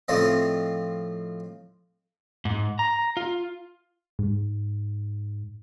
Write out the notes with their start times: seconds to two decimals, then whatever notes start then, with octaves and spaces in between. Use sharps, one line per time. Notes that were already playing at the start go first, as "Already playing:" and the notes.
0.08 A2 F3 C4 D#5
2.45 G#2
2.79 A#5
3.17 F4
4.19 G#2